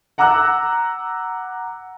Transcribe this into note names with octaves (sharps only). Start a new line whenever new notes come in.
F#5 A#5 D6 E6 F#6